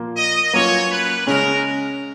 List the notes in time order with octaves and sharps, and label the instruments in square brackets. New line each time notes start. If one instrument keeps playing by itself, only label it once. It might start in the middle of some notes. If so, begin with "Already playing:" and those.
Already playing: [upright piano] A#2 F3 A#3 F4
[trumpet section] D#5
[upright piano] F#3 A#3 C#4 F4 [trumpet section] C#5
[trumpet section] B4
[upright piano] C#3 G#3 C#4 [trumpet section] A#4